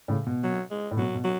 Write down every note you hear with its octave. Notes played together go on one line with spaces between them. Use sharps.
A2 C#3
B2
F#3
G#3
A2
B2 F#3
B2
F#3